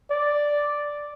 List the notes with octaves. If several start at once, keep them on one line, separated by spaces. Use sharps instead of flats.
D5